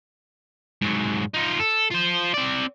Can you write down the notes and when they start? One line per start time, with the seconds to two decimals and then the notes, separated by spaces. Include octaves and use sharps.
0.82 G#2 F#3
1.34 D#4 F4
1.59 A4
1.90 F4 C5
2.34 C4 D5